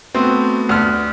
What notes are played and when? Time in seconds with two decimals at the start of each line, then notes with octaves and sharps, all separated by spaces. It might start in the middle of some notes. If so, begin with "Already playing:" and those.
0.15 A3 B3 C4 F#4
0.69 D2 F6